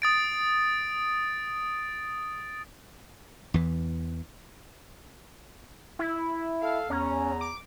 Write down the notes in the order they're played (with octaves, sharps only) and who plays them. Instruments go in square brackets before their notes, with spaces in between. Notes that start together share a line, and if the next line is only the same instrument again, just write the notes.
[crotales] D#6 A6 D7
[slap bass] E2 E3
[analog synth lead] E4
[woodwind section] A4 F5
[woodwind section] E2 A#5 [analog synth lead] C#4
[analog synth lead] D6